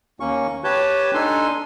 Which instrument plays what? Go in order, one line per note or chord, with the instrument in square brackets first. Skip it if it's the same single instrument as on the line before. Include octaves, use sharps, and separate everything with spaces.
[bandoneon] D#2 A#3 C#4 C#6
G4 B4 C#5 A5 G6
D4 D#4 A4 G#5 C6